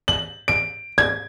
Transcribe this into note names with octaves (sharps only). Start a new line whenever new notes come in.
F#7
D7
G#6